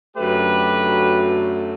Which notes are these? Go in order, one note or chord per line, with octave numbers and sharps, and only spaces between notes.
F#2 D3 F#3 A3 G4 B4